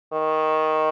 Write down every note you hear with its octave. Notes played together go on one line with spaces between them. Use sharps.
D#3